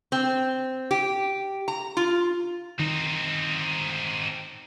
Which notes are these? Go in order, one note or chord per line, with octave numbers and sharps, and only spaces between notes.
C4
G4
A#5
F4
D#3 C4 D#4